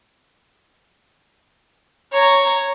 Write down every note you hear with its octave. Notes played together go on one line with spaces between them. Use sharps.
C#5 A#5